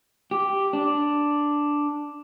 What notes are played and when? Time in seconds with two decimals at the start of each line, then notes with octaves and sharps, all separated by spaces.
0.31 G4
0.73 D4